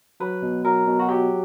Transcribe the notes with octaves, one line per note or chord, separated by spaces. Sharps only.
F#3 B4
B2
F#3 A#4
B2
F#4
F#3 G4